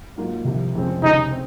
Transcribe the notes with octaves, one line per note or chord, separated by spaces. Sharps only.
G#2 F#3 A#3 F4
C2 C3 F3
F1 F2 C#3 G#3 C4
C#2 C3 D#3 G#3 C#4 D#4
C4